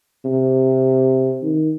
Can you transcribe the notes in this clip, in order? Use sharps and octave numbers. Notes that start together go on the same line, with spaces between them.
C3
D#3